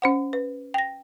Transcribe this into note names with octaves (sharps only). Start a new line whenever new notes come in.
C#4 C5 F#5
B4
G5 A#6